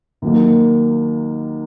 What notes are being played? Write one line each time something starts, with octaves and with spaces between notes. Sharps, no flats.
D#2 D#3 F#3 A#3